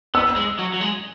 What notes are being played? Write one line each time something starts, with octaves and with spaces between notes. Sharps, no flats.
B3 E6
G#3
F#3
F#3
G#3